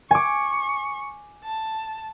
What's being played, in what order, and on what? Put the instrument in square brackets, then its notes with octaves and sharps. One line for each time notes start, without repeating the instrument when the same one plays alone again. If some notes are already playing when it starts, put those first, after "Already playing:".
[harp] G#5 D6 [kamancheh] C#6
[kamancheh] A5